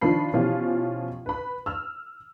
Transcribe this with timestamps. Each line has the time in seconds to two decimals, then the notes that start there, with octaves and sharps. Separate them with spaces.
0.01 D#3 F3 D4 B5 C7
0.33 B2 E3 F3 C#4 F4 G4
1.26 B4 B5
1.66 E6 F6